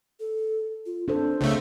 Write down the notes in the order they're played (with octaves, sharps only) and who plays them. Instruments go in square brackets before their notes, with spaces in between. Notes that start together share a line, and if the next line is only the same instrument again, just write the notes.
[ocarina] A4
F4
[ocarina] C4 [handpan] D4 A4 C5
[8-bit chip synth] C#2 A3 [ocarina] C#5